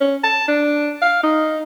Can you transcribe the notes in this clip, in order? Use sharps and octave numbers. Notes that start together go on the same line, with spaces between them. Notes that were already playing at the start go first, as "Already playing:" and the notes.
C#4
A5
D4
F5
D#4